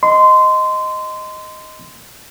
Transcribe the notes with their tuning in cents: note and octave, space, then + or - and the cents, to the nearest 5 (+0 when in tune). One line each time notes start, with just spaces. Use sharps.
D#5 +0 C6 -20